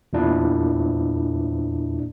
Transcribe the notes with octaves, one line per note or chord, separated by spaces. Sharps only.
E2 A#2 D4 E4